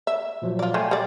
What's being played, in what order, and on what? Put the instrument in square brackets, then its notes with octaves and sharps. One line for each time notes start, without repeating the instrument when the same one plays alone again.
[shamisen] E5
[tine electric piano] A#2 F3 F#3
[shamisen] F4 D5
[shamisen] A3 [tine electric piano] G5 G#5 C6
[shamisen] G3 D5